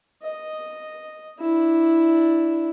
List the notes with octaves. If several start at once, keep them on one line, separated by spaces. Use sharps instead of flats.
D#5
D4 E4